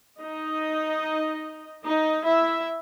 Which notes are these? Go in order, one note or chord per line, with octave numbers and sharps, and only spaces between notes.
D#4 D#5
D#4 D#5
E4 E5